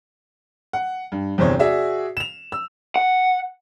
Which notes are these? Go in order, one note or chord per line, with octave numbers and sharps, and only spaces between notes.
F#5
G2
G1 E2 C3 C5 C#5
F#4 G#4 D5 E5
E7 F7
E6
F#5